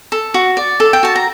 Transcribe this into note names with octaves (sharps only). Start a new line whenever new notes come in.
A4
F#4
D5
A4
G5
F#4 A5
A#5